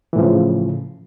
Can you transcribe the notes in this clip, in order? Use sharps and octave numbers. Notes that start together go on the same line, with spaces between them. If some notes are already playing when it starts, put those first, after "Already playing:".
A2 C#3 E3 F3